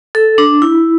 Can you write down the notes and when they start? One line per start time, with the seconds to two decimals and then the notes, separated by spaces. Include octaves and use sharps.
0.15 A4
0.38 D4
0.62 E4